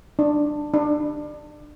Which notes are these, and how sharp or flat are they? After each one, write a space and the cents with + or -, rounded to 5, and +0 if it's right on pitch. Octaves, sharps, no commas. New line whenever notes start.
D4 +15
D4 +25